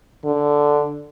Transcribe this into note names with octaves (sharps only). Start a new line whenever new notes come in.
D3